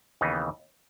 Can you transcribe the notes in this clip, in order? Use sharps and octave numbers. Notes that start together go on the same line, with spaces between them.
D#2 C#3 E3 B3 D#4